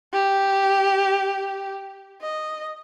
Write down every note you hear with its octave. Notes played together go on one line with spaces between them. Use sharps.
G4
D#5